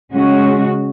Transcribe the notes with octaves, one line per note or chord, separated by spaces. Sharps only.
C#3 G#3 C#4 F#4